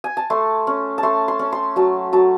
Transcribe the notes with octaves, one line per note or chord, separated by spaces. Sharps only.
G#5
A5
A3 C6
C#4
A5
A3 C6
C6
C#4
C6
F#3 A5
F#3 A5